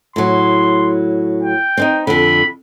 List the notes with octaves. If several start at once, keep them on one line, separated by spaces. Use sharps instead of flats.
A2 F#3 C6
G5
C4 D4 D#4
F2 D3 B5